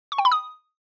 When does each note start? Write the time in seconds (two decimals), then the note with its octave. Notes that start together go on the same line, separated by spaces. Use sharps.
0.12 C#6
0.18 G5
0.25 B5
0.32 D#6